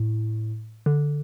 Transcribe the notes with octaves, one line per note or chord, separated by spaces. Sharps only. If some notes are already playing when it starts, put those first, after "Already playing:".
Already playing: A2
D3